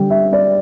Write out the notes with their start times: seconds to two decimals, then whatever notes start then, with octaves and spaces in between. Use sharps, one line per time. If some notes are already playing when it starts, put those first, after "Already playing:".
Already playing: D3 G3 G5
0.10 E5
0.33 D5